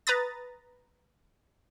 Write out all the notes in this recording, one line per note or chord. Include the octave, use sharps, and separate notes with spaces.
B4 A#5 B5 D#6 A6